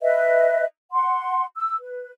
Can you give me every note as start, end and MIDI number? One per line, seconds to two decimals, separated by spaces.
0.01 0.64 71
0.01 0.64 75
0.01 0.64 76
0.92 1.45 78
0.92 1.45 84
1.56 1.75 88
1.79 2.11 71